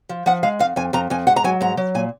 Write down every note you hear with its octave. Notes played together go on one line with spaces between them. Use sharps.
F3
F3 F#5
G#3 F5
F2 F5
F2 G#5
F2 A#5
F2 G#5
G#2 F#5
A#5
F#3 G#5
G#2 A#5
F#3
A#2 G#5